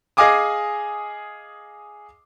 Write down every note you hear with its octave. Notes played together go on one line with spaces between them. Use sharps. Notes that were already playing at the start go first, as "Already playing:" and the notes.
G#4 D#5 F5 G#5 D6 D#6